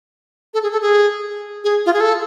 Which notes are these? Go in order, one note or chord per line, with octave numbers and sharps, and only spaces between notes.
A4
G#4
A4
G#4
G#4
F4
G#4
A4